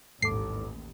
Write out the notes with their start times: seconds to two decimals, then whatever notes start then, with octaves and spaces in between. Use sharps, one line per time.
0.22 A1 D#2 G#2 A4 D6 C7